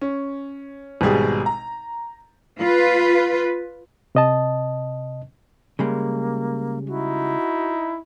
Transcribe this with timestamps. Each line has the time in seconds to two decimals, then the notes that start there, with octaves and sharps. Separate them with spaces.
0.01 C#4
1.01 G#1 B2 G3 G#4
1.46 A#5
2.60 F4 B4
4.15 C3 D#5 A5
5.79 C#3 G3 G#3 A#3
6.88 D#4 E4 F#4